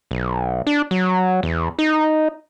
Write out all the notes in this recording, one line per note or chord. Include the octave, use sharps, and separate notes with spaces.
B1
D4
F#3
E2
D#4